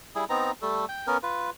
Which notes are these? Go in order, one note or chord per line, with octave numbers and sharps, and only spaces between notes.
G3 E4 G#4
B3 C4 D#4 A#5
G3 A3 A4
G5
B3 C#4 A#4
F4 B4